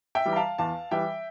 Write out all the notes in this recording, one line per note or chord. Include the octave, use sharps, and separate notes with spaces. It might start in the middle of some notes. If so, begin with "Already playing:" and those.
E5 G5
E3 G3
A#5
F5 A5
E2 F5 A5
E3 G3 E5 G5